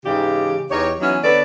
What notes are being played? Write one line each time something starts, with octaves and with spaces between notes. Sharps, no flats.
G#2 C#3 E3 D#4 G4
E2 D#4 G4 C#5
E3 F#3 B3 C#4 D#4 E4
D3 B3 A4 B4 C#5 D5